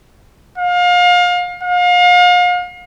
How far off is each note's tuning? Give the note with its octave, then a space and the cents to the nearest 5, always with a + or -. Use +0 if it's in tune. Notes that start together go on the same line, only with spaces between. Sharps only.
F5 +30
F5 +35